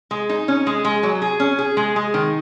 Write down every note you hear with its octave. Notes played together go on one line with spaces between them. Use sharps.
G#3
D#4
C#4
G#3
G#3
F#3
G#4
C#4
G#4
G#3
G#3
D#3